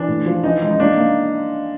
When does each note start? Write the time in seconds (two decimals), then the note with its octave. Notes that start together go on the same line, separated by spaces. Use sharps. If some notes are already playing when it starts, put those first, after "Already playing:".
Already playing: E3 D4
0.08 A2
0.26 F3
0.43 E3 D#4
0.62 G#3
0.70 D#4
0.79 A#3 D4
0.97 A#3